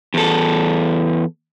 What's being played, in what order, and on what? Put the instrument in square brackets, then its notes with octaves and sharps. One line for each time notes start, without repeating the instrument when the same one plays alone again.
[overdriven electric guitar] E2 A4